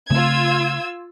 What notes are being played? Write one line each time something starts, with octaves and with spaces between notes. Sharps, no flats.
C#3 A3 C4 F4 E6 G#6